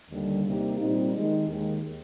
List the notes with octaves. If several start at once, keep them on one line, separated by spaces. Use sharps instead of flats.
D#2 D3 G3
C3 G3 A#3 D#4 G4
A#2 G3 C4 D#4
D#3 G#3 D#4
D#2 D#3 G#3